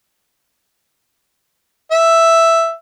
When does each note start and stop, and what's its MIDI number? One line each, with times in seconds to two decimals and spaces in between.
1.92 2.73 76